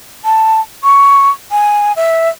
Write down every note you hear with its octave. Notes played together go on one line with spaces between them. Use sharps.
A5
C#6
G#5
E5